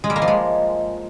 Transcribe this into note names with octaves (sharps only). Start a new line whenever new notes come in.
G#3
G3
A#3
F3
G#3